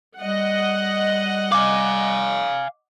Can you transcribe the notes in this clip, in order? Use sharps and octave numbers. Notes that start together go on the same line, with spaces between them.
G3 D#5 F#5
F5 G#5 D6